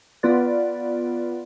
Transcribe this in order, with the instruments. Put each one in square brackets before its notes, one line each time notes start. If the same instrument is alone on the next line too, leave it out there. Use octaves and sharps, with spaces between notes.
[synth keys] B3 F4 B4 D5